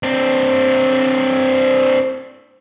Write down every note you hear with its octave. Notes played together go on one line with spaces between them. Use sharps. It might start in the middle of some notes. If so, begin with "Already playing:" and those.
C4 D4